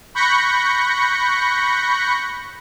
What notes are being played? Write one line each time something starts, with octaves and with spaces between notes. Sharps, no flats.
B5 C#6 F#6 G6 A#6 C#7